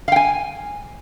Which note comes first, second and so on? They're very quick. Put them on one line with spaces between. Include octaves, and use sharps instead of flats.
F5 G5 G#5